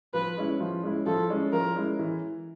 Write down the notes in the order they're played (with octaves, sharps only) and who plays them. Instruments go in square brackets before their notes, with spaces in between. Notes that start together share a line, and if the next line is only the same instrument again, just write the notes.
[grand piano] F3 [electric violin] B4
[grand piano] G#3 C#4 E4
F3
G#3 C#4 E4
[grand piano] F3 [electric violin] A4
[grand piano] G#3 C#4 E4
[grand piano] F3 [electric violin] A#4
[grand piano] G#3 C#4 E4
E3